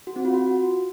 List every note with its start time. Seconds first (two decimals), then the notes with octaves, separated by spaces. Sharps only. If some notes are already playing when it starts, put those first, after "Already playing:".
0.07 F#4
0.16 C4
0.25 F4
0.34 F#4